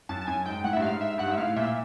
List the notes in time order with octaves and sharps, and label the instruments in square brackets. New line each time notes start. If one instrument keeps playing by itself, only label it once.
[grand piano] F#2 [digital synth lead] A5
[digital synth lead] A5
[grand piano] F#2 [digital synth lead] G#5
[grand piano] G#2 [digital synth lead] G5
[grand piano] A2 [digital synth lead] F#5
[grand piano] G2 [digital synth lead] E5
[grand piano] G#2 [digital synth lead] F5
[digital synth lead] E5
[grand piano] G2 [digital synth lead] F#5
[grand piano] G#2 [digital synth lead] E5
[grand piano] A2 [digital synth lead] F5
[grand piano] A#2 [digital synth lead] E5